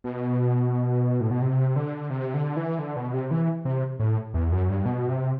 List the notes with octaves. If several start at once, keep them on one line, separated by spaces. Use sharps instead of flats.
B2
A2
B2
C3
D3
C3
D3
E3
D3
B2
C3
E3
C3
A2
E2
F#2
G2
B2
C3